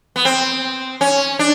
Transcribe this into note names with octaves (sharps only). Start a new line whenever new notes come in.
B3
C4
C#4
D4